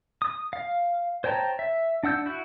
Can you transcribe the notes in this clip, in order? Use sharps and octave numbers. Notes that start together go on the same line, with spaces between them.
D#6
F5
C5 C#5 G5 A5 A#5
E5
D4 F#5 E6 G6
E4 F#4